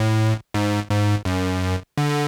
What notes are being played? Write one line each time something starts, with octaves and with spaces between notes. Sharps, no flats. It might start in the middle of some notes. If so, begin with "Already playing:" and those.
Already playing: A2
G#2
G#2
F#2
D3